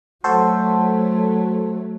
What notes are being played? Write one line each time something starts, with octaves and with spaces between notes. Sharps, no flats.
F#3 A3 F#4 A4 C5